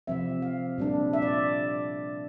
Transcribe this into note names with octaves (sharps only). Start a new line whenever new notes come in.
C3 F3 C4 E5
F5
A#2 G3 D4
E5
D5